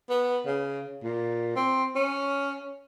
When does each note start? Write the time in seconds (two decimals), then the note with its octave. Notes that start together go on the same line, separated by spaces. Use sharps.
0.10 B3
0.47 C#3
1.03 A#2
1.56 C4
1.96 C#4